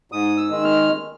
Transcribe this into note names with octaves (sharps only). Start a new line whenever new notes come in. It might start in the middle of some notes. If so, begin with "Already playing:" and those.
G#2 D#6
E6
D#3 G#3
F6